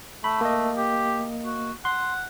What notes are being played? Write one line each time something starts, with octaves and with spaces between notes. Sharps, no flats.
A3 B5
A#3 D#5
G4
F#4
F#5 C6